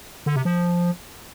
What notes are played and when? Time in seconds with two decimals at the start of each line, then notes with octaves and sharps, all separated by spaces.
0.26 D3
0.36 C3
0.45 F3